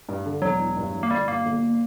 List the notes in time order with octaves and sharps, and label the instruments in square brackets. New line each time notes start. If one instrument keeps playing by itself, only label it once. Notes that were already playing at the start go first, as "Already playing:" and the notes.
[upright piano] G2
D3
[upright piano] E1 [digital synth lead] F#3
[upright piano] E2
G2
E3
[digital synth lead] A#3
[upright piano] G1 [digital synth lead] G3
[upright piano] G2 [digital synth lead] A#3
[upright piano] G1